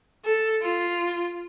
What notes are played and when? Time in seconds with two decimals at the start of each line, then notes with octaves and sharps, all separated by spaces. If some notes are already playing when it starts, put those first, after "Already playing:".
0.25 A4
0.62 F4